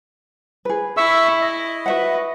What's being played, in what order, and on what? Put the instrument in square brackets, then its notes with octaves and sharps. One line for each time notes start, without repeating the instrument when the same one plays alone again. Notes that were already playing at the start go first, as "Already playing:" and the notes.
[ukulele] G#4 B4
[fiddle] E4 [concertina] E5 C#6 E6
[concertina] D#5
[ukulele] F#4 E5 F#5 [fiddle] B4